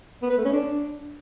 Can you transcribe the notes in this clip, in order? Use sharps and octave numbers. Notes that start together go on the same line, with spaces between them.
B3
B4
A3
C#4
D4